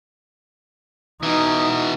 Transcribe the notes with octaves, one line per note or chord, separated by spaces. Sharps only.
B2 E3 D#4